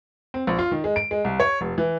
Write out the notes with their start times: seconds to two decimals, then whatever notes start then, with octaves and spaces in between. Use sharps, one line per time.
0.34 C4
0.47 A#1
0.59 F4
0.71 D#3
0.84 G#3
0.96 D7
1.11 G#3
1.25 C2
1.40 C#5
1.61 F1
1.78 E3